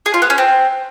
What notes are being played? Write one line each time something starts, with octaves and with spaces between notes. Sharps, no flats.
G#4
F4
B3
C#4
C4